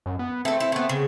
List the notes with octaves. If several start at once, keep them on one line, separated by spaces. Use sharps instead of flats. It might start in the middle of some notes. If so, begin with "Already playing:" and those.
F#2
B3
A3 C4 A4
E4
A3 B3
C#3